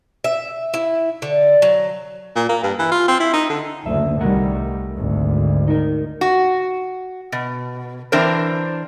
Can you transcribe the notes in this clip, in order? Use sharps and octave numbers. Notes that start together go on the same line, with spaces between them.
E5
E4
D3
F#3
A#2
A#3
G2
E3
F4
C4
E4
D#4
D3
F#1 D2 E5
C2 D#3 G3 A3 A#4 F#5
G#1 D2
D#4 A#4
F#4
B2
E3 C4 D4 A#4 C5